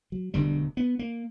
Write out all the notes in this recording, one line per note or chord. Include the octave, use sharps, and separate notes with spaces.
F#3
E1 D2 D3 G3
B3
A#3